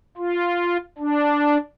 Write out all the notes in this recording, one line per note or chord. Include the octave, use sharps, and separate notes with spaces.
F4
D4